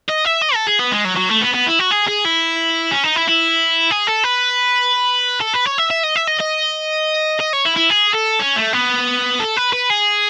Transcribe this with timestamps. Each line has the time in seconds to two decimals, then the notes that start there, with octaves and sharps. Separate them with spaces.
0.09 D#5
0.25 E5
0.42 D#5
0.55 A4
0.67 G#4
0.79 B3
0.92 G#3
1.05 F#3
1.17 F#3
1.29 A3
1.42 B3
1.54 B3
1.67 E4
1.80 F#4
1.91 G#4
2.08 G#4
2.25 E4
2.91 C#4
3.04 D#4
3.16 E4
3.28 E4
3.91 G#4
4.07 A4
4.24 B4
5.41 A4
5.54 B4
5.65 C#5
5.78 E5
5.90 E5
6.03 D#5
6.16 E5
6.27 D#5
6.40 D#5
7.40 D#5
7.53 C#5
7.65 E4
7.77 E4
7.90 G#4
8.15 A4
8.40 C#4
8.56 A3
8.73 B3
9.39 A4
9.56 B4
9.73 B4
9.90 G#4